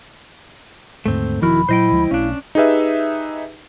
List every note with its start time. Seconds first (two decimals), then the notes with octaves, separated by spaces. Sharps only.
1.06 D#2 G#2 D3 A3 C4
1.42 E1 D#3 F3 B3 E4 F#4 A#4 B5
1.69 A#2 F#3 E4 C5 D#5 G5
1.92 D2 F3 G#3
2.11 B1 A3 C#4 D4 F5
2.55 D#4 G4 G#4 B4 E5